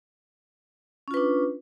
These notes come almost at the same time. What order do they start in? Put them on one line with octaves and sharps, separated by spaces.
C#4 F4 B4 D4